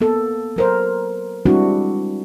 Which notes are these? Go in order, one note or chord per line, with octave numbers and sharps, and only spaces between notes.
A#3 B3 A4
F#3 A#4 C5
G3 G#3 C4 D4 E4 F#4